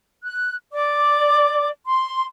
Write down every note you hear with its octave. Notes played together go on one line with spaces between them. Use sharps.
F#6
D5 D6
C6